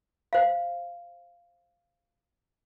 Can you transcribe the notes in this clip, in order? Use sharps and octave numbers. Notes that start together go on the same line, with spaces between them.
C5 F5